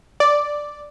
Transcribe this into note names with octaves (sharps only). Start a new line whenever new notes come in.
D5